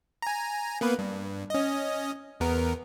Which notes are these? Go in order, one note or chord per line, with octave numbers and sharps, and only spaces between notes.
G#5 A#5
A#3 B3 B4
G2
C#4 D#5
E2 B3 A#4